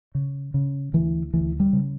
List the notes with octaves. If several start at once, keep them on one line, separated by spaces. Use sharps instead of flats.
C#3
C#3
D2 E3
D2 E3
G3
C#3